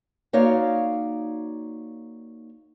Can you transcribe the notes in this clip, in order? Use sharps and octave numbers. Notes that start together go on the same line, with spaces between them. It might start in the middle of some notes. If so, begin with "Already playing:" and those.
A#3 D#4 F#4 C#5 D5 F5